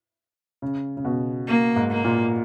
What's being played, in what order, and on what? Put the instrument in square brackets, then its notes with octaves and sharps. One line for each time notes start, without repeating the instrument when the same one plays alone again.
[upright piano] C#3
C#3
B2
[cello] A#3
[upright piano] G#2
[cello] A#3
[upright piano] A#2